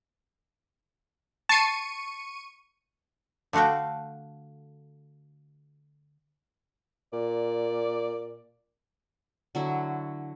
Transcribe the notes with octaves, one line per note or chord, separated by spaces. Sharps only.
A5 C#6 C7 C#7 D#7
D3 A3 F#4 F5 G5
A#2 D5
D3 F#3 E4